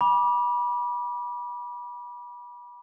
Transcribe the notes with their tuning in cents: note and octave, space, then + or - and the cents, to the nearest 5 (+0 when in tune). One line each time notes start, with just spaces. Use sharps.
G#5 -20 B5 -30 D6 +0